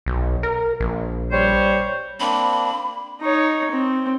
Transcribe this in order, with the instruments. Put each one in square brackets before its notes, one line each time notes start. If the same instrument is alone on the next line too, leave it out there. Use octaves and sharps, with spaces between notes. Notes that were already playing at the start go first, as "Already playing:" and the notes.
[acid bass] B1
A#4
A#1
[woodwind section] G3 C5 C#5
[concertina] A#3 C4 D4 [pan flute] B5
[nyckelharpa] D#4 C#5
C4